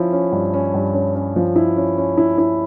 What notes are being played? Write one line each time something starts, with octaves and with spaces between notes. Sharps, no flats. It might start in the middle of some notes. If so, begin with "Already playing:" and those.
Already playing: F3 C#4 E4
C#4
G2
C#4
G2
C#4
C#4
F3
E4
C#4
C#4
E4
E4